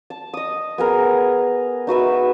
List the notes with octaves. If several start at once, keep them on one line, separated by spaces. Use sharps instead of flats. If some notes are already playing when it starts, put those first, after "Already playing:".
A5
D#5 D#6
B3 G#4 A#4
D#4 F#4 B4 E5